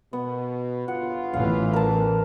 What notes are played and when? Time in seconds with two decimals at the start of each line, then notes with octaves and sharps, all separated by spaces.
0.13 B2 B3
0.88 G1 C#3 F4 F#5
1.33 A1 E3 F5
1.73 A#4 A5